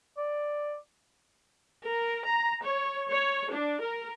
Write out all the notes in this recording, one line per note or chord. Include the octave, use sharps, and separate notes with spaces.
D5
A#4
A#5
C#5
C#5
D4
A#4